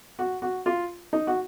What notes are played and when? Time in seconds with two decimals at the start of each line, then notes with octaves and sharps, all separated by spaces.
0.19 F#4
0.42 F#4
0.66 F4
1.13 D#4
1.27 F#4